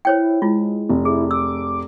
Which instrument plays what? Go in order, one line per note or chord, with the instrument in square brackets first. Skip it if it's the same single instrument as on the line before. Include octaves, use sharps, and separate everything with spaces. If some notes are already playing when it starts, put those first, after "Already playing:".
[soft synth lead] E4 [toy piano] C5 C#5 G5
[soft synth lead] G#3 [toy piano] E4 F4
[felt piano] F1
[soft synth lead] E4 [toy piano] G#4
[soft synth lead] D6 [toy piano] E6